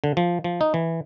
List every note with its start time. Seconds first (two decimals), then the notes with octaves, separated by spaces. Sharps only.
0.04 D3
0.17 F3
0.44 F3
0.61 D#4
0.74 E3